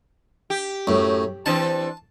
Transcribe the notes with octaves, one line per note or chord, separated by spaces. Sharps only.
G4
F#2 A2
E3 C4 D4 A5